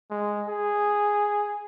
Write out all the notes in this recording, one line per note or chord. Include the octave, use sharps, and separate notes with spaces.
G#3
G#4